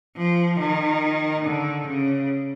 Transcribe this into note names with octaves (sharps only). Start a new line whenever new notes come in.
F3
D#3
D3
C#3